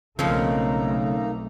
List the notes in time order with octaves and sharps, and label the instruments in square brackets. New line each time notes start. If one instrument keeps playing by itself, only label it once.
[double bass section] B1 A3 [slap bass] C#3 [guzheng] F3 C4 [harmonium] A#3 D#4 A#5